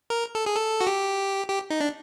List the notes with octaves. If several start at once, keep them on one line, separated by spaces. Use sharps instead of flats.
A#4
A4
G#4
A4
F#4
G4
G4
D#4
D4